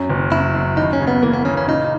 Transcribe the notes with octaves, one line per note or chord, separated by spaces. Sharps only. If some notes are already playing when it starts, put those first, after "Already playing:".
Already playing: F#2 C#4
F#1
F#2 E4
F#2
D#2 D#4
C#4
C#3
B3
E3 A#3
B3
C#3 C#4
C#4
A#2 D#4